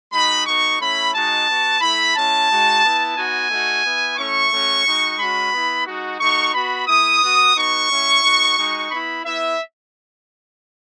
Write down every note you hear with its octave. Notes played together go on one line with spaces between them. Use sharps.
G#3 D#4 F#4 B5
B3 D#4 F#4 C#6
A3 C#4 E4 B5
G#3 D#4 F#4 A5
B3 F#4
A3 E4 B5
G#3 C#4 E4 A5
G#3 D#4 F#4
B3 E4
B3 D#4 F#4 G#5
A3 D#4 F#4
B3 E4
A3 C#4 E4 C#6
A3 C#4 F#4
G#3 D#4 F#4
G#3 C#4 F#4 B5
B3 E4
G#3 D#4 F#4
A3 D#4 F#4 C#6
B3 F#4 B5
A3 E4 D#6
B3 F#4
B3 D#4 F#4 C#6
G#3 C#4 E4
B3 D#4 F#4
G#3 D#4 F#4
B3 E4 B5
B3 E4 E5